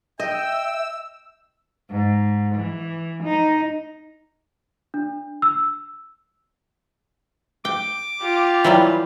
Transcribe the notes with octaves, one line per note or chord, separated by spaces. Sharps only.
D#5 E5 G5 E6
G#2
E3
D#4
D4
E6
G5 D6
F4 G4
E3 F#3 G3